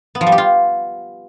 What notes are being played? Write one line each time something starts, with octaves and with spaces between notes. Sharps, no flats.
B3
F3
G3
G4
F4